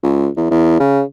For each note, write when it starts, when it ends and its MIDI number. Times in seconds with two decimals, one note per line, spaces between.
0.03 0.29 37
0.37 0.46 40
0.51 0.80 40
0.80 1.02 49